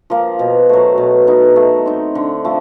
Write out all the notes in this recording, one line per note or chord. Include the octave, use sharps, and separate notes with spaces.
F3 A#3
B2
F#3 A3
B2
F#3 B3 D#4
A3
C4 D#4
D3
F3 A3